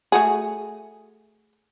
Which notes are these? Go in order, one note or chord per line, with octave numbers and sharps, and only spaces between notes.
A3 F#4 G#4